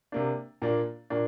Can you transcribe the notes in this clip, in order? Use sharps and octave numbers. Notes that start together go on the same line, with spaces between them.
C3 A#3 D4
A#2 A#3 D4
A#2 A#3 D4